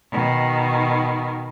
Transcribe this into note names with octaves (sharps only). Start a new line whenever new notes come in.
B2 D#3